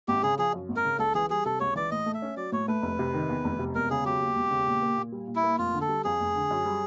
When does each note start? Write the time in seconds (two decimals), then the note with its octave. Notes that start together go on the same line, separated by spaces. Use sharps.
0.08 G#1 G4
0.23 C#3 G#4
0.38 F3 G#4
0.53 F#2
0.69 G#1
0.76 A#4
0.85 C#3
0.99 C#2 A4
1.15 E3 G#4
1.30 G3 G#4
1.45 C3 A4
1.60 C#2 C#5
1.76 E3 D5
1.91 A2 D#5
2.06 A3
2.14 E5
2.22 C#4
2.37 F#3 D5
2.52 A2 C#5
2.68 A3 B4
2.82 F1
2.99 C3
3.14 D#3
3.29 E2
3.44 F1
3.59 C3
3.75 E1 A#4
3.90 C#3 G#4
4.05 F#3 G4
4.21 D#2
4.36 E1
4.51 C#3
4.66 A#2
4.82 A#3
4.97 A#2
5.12 G3
5.28 A#2
5.36 E4
5.43 A#3
5.58 F1 F4
5.74 D3
5.81 A4
5.88 G3
6.04 F2 G#4
6.20 F1
6.36 D3
6.51 F#2
6.66 G3